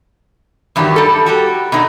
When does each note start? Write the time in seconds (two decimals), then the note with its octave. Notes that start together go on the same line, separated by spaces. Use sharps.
0.76 E2 G2 D#3 F#3 G4
0.96 G3 A4
1.26 F#4 G4 A4
1.72 B2 D4 D#4 G4 A4